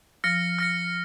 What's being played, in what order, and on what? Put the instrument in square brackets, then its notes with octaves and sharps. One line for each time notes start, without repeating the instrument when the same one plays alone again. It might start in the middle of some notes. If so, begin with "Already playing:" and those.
[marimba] F3 [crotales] F6 A#6 C#7
[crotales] F6 A#6 C#7